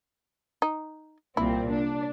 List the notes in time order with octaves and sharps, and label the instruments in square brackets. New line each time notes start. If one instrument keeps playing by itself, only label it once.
[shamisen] D#4
[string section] C2 A#2 C4 [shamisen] E4
[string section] D4